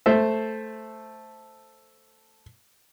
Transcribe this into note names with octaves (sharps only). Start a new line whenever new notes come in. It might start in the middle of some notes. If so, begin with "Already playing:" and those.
A3 C5 E5